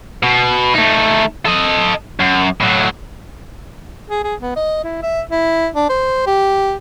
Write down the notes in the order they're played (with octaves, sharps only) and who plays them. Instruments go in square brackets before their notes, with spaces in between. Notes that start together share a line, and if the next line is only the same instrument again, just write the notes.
[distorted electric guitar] B2
A3 D#4
A4 D#5
F#2
A2 F#3
[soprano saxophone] G#4
G#4
B3
D#5
E4
E5
E4
D4
C5
G4